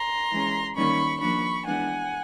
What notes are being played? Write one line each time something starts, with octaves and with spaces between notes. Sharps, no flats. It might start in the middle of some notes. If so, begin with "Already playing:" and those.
Already playing: A#5 C6
E3 G#3 C#4
D#3 G3 A#3 C#4 B5 C#6
F3 A#3 D4 B5 C#6
E3 G#3 B3 D4 F#5 G#5